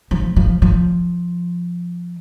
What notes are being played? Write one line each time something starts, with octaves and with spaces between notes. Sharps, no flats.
F3
F3
F3